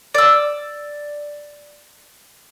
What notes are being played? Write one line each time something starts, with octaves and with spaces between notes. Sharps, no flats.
D5 E6